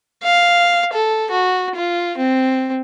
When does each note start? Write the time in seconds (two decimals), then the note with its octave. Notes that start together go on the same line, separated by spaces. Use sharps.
0.23 F5
0.94 A4
1.31 F#4
1.75 F4
2.17 C4